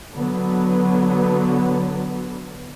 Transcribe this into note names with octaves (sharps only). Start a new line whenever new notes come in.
D3 F#3 B3